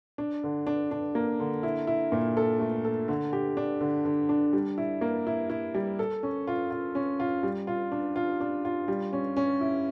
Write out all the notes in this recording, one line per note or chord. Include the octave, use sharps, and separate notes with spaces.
D4
D3
D4
D4
A#3
D3
E4
E4
A#2
A4
A3
A4
D3
G4
D4
D3
D3
D4
G3
E4
A#3
E4
E4
G3
A4
C#4
F4
F4
C#4
F4
G3
F4
D4
F4
D4
F4
G3
C#4
C#4
E4